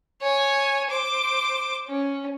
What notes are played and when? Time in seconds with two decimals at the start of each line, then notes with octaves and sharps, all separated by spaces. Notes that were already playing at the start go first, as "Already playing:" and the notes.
0.21 C#5 G#5
0.90 C5 D6
1.88 C#4